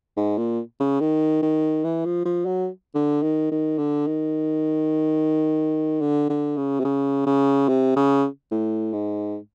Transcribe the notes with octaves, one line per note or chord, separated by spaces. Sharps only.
G#2
A#2
C#3
D#3
D#3
E3
F3
F3
F#3
D3
D#3
D#3
D3
D#3
D3
D3
C#3
C3
C#3
C#3
C3
C#3
A2
G#2